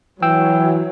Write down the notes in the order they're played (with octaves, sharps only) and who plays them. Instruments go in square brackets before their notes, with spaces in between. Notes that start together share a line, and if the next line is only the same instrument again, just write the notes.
[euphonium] E3 [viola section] F#3 [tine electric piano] G5 E6